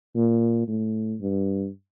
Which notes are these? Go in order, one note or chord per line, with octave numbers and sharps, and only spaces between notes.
A#2
A2
G2